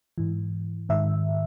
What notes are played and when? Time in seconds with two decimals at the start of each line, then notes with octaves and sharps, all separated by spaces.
0.18 G#2 E3
0.89 G#2 D#3 E5